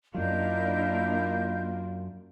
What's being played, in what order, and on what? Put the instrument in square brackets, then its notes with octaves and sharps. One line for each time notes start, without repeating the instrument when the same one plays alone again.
[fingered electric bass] F#2 F#3 [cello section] A#3 D4 [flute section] E4 D#5 G6 [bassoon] F4